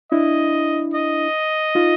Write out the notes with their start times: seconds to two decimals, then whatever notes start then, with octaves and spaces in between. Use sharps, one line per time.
0.12 D4 E4 D#5
0.94 D#5
1.75 D#4 F4